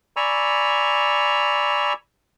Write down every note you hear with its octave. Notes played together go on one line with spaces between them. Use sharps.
D5 G#5 A#5 B5 C#6 E6